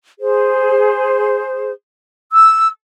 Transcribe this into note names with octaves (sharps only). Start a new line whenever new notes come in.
G#4 C5
E6